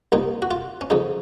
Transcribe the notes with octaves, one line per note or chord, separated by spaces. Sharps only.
C2 A#2 D#4
F#4
F4
C#4
F2 C#3 D#4